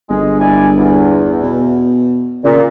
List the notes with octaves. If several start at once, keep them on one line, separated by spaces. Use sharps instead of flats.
G1 G#3
E4 D5 G#5
E2
B2
A#2 C#3